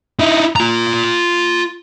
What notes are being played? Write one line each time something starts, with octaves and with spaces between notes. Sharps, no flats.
D#4 E4
F4 A#5